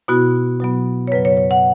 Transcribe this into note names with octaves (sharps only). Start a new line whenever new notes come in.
B2 B3 E4 F#4
B2 F#3 B3
C#5
F#2 C#3 F#3 B4
C#5
C#5
F#5